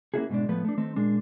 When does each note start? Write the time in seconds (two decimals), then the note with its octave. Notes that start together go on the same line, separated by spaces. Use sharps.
0.14 A#3 C4 C#4 E4 F#4 G#4
0.30 G#2 B2 G#3 D4
0.49 A2 F3 A3 B3 B4
0.65 A3 D4
0.77 D#3 A3 C4
0.96 A#2 G#3 D4